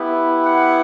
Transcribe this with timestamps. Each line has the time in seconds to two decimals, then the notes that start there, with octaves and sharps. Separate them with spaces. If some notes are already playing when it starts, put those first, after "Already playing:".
Already playing: B3 E4 G4
0.45 F#5